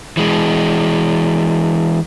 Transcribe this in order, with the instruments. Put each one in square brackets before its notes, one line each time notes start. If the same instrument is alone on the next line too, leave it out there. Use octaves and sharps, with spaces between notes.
[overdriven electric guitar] E3 G#3